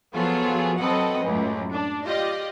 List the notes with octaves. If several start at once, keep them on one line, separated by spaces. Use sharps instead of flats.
F3 F#3 B3 F4 G#4 A4
F#3 C4 A4 B4 D#5 F#5
C#2 F#2 A2
D4
F4 G4 D5 D#5